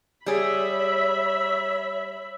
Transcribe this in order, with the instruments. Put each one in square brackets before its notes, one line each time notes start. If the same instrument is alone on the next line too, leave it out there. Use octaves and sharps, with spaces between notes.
[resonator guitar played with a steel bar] G3 G#4 [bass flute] C#5 [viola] E5 B5